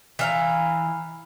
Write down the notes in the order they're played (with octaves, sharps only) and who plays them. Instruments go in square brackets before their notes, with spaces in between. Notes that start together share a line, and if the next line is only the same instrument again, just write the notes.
[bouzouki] E3 F5 A#5